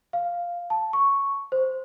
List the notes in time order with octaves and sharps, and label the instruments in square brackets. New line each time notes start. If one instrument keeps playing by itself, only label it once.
[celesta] F5
A5
C#6
C5